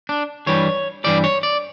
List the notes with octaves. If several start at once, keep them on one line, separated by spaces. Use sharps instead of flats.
D4
G2 E3 G3 C#5
G2 E3 G3 D5
C#5
D5